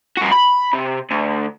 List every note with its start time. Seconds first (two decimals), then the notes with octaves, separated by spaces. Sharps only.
0.17 G2 F#4
0.32 B5
0.73 C3
1.11 D2